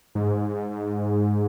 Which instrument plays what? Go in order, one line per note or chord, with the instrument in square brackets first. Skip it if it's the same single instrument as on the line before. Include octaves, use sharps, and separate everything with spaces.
[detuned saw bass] G#2